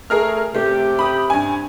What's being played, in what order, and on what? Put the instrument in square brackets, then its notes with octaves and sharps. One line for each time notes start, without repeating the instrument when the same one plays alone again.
[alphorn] A3 [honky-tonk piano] G#4 A#4 F6
[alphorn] C3 [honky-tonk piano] A3 [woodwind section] G4
[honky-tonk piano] B5 D#6
G2 G#5